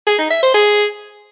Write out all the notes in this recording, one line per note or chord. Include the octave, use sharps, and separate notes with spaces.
G#4
D#4
E5
C5
G#4